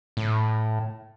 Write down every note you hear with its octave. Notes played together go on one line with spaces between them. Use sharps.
A2